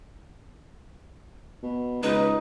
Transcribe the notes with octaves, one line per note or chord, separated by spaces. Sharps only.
B2
C#2 D#4 B4